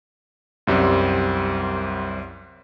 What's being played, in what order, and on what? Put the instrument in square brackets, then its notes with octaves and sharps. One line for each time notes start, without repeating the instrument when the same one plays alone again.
[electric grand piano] C2 F#2 G3 C4